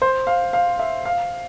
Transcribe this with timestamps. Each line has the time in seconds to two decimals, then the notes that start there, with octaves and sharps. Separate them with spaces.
0.02 C5
0.27 F5
0.53 F5
0.79 E5
1.05 F5